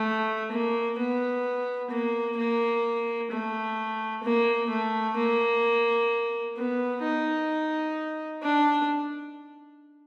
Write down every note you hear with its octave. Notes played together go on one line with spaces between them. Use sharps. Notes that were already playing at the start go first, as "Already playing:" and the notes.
Already playing: A3
A#3
B3
A#3
A#3
A3
A#3
A3
A#3
B3
D#4
D4